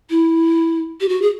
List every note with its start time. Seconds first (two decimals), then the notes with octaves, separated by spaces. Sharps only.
0.10 E4
1.01 G4
1.09 F#4
1.22 G#4